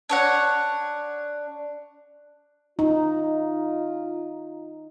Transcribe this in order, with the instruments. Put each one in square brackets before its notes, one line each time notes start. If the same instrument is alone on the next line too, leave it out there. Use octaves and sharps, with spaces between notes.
[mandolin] D4 C#5 F#5
[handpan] D#4 [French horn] F4